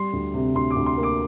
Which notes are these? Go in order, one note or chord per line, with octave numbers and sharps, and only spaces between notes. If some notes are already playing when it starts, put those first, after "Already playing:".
Already playing: G3 C6
D2
C3
D2 C6
D6
D2
C6
A#3
D6